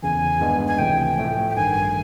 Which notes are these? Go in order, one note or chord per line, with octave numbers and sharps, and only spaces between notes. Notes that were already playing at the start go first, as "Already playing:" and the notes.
E2 C#3 E3 G#5
G2 D#3 G#3 B3 D4
G#5
C#2 C3 E3 A3 G5
A2 F3 A3
G5
A1 G2 D#3 G#5